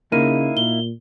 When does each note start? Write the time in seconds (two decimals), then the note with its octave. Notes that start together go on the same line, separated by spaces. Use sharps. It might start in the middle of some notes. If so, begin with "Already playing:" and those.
0.12 C#3 A#3 D#4 E4 D#7
0.57 A#2 G7